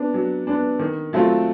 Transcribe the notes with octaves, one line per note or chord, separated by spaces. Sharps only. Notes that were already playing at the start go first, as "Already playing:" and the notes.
Already playing: B3 D4
F#3
B3 D4
D#3
F#3 A3 C4 F4